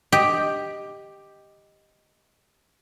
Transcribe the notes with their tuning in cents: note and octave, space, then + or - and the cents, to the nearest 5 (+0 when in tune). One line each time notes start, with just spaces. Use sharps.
G4 +5 D#5 +0